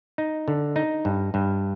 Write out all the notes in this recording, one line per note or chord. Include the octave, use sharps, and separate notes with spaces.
D#4
D3
D#4
G2
G2